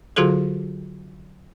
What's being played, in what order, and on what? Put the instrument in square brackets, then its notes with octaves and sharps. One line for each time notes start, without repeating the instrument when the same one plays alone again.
[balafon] D3 F#3 F4 F#4 G#4 A4